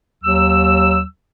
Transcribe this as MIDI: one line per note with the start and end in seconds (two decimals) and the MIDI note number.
0.23 1.03 39
0.23 1.03 54
0.23 1.03 88